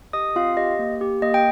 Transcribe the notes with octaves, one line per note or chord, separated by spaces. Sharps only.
G4 D#5 D#6
C4 F4 F5
G4 D#5
A#3
G4
A#3 D#5
G5